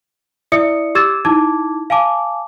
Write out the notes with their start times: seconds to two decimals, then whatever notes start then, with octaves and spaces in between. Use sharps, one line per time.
0.52 E4 D5 E5 D#6 C#7
0.95 G4 D6 E6 G#6 A6 E7
1.25 D#4 E4 A5 D6 G#6
1.90 F5 G#5 A5 D6